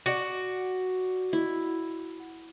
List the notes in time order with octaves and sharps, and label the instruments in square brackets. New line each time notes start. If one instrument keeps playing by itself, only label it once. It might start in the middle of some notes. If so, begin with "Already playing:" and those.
[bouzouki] F#4 D5
[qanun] E4